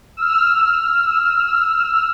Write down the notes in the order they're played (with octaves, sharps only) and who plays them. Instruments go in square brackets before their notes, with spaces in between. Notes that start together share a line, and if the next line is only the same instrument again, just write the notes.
[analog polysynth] E6 F6